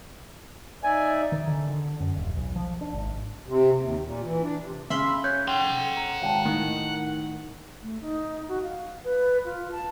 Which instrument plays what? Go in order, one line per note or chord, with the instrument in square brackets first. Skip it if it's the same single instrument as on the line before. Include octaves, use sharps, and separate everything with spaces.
[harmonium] D#4 D5 E5 [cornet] G#5
[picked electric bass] D#3
D3
D3
F#2
D#1
B1
F3
D4
G#1
[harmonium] C3
D#2
A#2
E3
D4
C3
[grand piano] C#3 F6 B6 [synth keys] E5 B5 C6
[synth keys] C#4 [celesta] F#6 G6
[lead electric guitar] F#5 C6 [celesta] G5
[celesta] A#5
[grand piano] G#1 [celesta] F5 G5 A5
[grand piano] A2 [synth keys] D#3 [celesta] F#6
[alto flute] A3
D#4
F#4
F5
B4
F4
A5